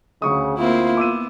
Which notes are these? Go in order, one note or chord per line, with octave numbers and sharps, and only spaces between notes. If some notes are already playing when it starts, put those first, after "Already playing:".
D2 C#3 C#6 D#6
A#3 C4 E4 F4
B3 D6 E6 D#7